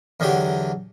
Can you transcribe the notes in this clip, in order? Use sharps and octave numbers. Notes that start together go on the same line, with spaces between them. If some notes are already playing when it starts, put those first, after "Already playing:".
E2 D3 F#3 G4